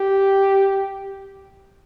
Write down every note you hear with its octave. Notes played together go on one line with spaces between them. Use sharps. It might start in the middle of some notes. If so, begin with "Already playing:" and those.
Already playing: G4